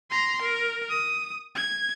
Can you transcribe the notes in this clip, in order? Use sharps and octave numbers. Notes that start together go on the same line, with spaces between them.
A#5 C6
A#4
D#6
G#6